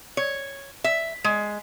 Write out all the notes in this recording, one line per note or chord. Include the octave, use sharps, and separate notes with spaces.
C#5
E5
G#3